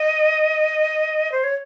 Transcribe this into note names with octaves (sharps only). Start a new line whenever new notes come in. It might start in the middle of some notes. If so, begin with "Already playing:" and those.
Already playing: D#5
C5
C#5